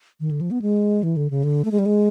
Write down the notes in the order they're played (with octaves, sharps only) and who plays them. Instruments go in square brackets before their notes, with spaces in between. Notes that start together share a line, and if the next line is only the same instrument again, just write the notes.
[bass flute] D#3
D3
F3
B3
G#3
E3
D3
C#3
D3
A3
G#3
G3
G#3